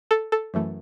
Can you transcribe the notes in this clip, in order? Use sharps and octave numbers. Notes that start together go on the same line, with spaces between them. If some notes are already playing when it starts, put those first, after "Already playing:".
A4
A4
F#2 E3 A3